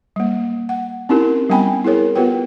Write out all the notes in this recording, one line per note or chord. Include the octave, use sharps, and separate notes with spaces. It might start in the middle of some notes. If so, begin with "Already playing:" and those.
G3 A#3
F#5
C4 C#4 D#4 E4 G4 A#4
G3 B3 C#4 G5 G#5 B5
E4 G#4 A#4 C#5
B3 F4 G4 B4 G5